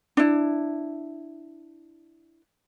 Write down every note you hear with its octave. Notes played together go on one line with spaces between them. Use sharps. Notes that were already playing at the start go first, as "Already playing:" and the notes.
D4 E4